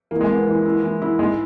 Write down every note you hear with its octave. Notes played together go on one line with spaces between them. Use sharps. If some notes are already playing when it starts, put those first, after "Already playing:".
E3 A#3
G#3
A#3 B3
E3
E4
E3
E4
G#2 G#3